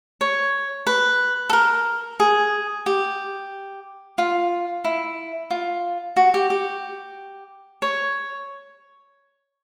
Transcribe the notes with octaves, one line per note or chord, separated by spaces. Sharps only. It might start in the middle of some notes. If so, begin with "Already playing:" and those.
C#5
B4
A4
A#4
G#4
G4
F4
E4
F4
F#4
G4
G4
C#5